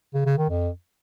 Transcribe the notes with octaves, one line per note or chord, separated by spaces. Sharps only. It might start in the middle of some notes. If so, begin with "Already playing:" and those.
C#3
C#3
D#3
F2